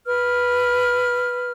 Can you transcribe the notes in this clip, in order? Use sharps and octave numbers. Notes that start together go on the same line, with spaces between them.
B4 F6